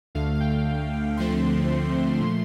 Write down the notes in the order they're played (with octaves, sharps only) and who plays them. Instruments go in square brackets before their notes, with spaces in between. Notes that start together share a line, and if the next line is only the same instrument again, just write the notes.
[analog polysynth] D2 D3 A3 F5
F5
G5
D2 D3 F3 A3 C4 C6
A#2 F3 A3